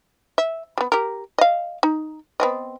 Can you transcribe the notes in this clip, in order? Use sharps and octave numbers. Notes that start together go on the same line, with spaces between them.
E5
G3 B3
G4 A#4
D#5 F5
D#4
B3 C4 D#5